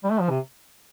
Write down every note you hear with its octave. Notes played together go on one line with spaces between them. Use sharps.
G3
A3
F3
C3